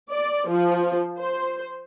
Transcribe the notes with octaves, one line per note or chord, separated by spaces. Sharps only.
D5
F3
C5